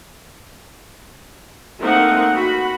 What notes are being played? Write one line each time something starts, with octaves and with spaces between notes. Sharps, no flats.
A3 A#3 C4 D#4 A#4 F#5
F#4 B5